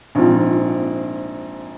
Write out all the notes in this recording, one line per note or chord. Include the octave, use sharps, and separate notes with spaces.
A#1 G#2 F3 C4 F4